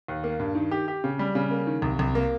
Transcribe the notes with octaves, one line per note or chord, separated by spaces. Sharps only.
D#2
A#3
G2
D#3
G4
G4
C#3
G3
C#3
A#3
D#3
C2
C2
A#3